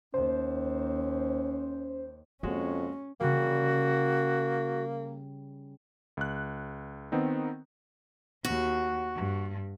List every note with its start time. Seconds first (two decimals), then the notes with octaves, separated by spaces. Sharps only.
0.14 D#2 C#4 C5
2.43 F2 G#3 A#3 C#4 F#4
3.20 C#3 G3 A#3 F#4
6.17 C#2 F#6
7.12 D#3 B3 C4 D#4
8.45 D#2 F#4
9.15 G2